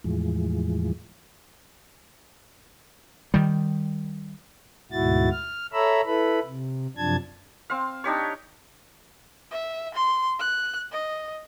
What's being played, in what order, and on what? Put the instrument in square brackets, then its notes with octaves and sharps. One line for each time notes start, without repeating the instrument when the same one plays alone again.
[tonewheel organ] E2 A2 E3 F3 G#3
[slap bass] D#3 G3
[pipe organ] D2 G#2 B2 E4 F#4 A6
F6
A4 C#5 E5 A#5 B5 E6
E4 A4 B4 B5
C3
F#2 C3 F3 D4 A5 G#6
[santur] C4 F5
D4 D#4 G4 C#5
[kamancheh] E5
C6
F#6
D#5